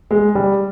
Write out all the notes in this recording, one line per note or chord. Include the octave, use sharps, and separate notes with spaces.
G#3
G3